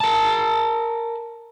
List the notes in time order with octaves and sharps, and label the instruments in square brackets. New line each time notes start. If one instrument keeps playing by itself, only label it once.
[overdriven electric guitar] A#4 A5